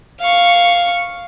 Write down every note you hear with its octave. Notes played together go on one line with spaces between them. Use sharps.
F5 C#6